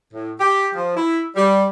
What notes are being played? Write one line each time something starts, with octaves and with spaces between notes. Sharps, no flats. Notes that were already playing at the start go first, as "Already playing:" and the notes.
A2
G4
F3
E4
G3